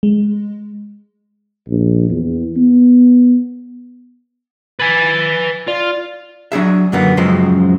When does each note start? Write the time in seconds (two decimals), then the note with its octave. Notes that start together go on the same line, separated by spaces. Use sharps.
0.03 G#3
1.69 A#1
2.10 E2
2.57 B3
4.79 B4 G#5 A6
5.68 F4 D5
6.52 F#3 D4 G#4 E5
6.92 F#2 D3 F#3 A#3 B3
7.17 F#2 C#3 F3 F#3 G#3 C4